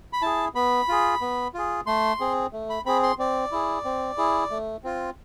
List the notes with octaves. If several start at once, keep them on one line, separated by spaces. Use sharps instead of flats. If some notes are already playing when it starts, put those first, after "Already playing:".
B5
E4 G#4 A5
B3 B5
F4 G#4
B3
F4 G#4
A3 C6
C4 G#4
A3
B5
C4 G#4 B5
C6
C4 D5
E4 G#4
C4
E4 G#4
A3
C4 F4